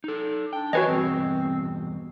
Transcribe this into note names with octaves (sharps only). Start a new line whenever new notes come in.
D#4 A4
D4 G5
E3 F#4 B4 C#5 D#5 G#5
E2 G2 B2 C4